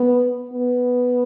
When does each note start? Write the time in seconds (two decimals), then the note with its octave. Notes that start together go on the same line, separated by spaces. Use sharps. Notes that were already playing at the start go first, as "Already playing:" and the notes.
Already playing: B3
0.53 B3